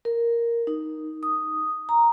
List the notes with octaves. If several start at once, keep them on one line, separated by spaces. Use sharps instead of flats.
A#4
D#4
D#6
A#5